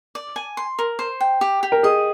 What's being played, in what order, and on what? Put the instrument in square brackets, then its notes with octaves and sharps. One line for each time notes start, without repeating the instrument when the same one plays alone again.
[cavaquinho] D5
G#5
C6
A#4
C5
G5
G4
G4
[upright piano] A#4
[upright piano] G#4 [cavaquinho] D#5